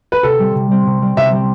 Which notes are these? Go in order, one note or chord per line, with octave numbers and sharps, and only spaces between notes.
B4
C3 A4
G3 C4
C3
G3 C4
C3
G3 C4
C3 E5
G3 C4